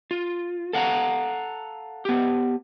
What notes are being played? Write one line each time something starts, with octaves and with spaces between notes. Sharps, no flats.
F4
A4 F5 F#5 G#5 A#5
B3 G4